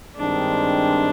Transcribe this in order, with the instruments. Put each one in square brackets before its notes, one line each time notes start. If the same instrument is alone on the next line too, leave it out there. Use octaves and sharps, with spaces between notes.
[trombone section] G2 D#3 G#3 C4 [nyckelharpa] D4